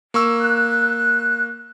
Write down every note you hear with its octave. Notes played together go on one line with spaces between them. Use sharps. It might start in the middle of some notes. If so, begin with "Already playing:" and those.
A#3 C#6 E6
F#6